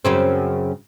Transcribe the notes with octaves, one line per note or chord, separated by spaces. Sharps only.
F#2 C#3 C4